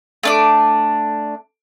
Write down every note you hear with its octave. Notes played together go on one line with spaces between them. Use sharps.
A3 D4 D6